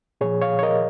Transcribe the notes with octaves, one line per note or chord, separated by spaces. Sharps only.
A#2 F3 G#4 C#5
C#5 F5
C#5
A#4 D#5